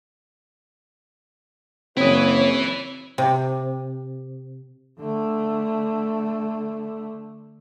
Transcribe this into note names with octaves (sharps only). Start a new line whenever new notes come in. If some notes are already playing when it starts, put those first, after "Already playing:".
F#1 C4 E4 B4 C#5 D#6
C3
D3 A3